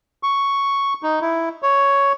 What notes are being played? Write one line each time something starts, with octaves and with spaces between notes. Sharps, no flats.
C#6
D#4
E4
C#5